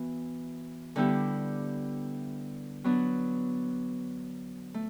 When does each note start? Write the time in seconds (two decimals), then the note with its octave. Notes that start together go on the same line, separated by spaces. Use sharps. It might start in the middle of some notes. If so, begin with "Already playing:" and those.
Already playing: E3 B3 F#4
0.96 D3 G3 B3 E4 G4
2.84 F#3 B3 D4
4.74 A3